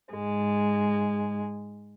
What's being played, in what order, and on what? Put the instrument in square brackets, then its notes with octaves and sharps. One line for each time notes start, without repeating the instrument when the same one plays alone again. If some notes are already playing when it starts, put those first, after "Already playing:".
[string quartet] G#2 G#3